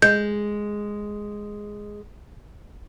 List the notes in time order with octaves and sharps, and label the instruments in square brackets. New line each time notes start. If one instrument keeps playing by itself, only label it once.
[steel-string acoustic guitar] G#3 [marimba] G6